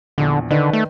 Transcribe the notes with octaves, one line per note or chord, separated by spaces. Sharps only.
A#1 E2 D3
D3 D#3 B4 D5
A3